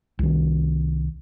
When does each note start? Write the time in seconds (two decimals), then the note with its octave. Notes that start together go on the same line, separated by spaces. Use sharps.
0.19 C2 D#3